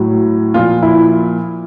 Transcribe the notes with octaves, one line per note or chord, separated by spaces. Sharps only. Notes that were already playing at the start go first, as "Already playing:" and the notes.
Already playing: A2 F#3
A#2 F3 F4
E4